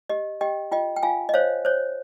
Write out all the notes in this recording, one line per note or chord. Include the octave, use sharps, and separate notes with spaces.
G4 D#5
G4 D#5 G5
F4 D#5 G5
G5
F4 F5 G#5
D#5
C5 C#5 F5
C5 C#5